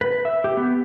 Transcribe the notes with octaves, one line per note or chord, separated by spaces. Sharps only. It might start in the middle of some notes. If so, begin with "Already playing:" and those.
B4
E5
G4
B3